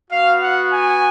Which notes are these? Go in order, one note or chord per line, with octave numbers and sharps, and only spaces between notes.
B3 F#4 F5
F#5
G#5